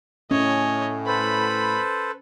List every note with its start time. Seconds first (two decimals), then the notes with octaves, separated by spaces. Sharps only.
0.31 A2 C#4 C#5 D#5
1.07 A4 B4 C5 B5